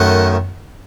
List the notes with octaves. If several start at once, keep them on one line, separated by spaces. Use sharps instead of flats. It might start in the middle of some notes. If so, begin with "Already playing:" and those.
Already playing: F#2 D#3 A3 D#5 F#5